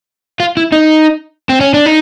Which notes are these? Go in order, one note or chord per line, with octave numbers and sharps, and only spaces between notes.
F4
E4
D#4
C4
C#4
D4
D#4